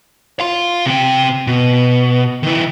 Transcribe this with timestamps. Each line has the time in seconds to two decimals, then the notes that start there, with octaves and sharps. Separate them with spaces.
0.40 F5 C6
0.86 C3 G5
1.47 B2
2.43 D#3 E4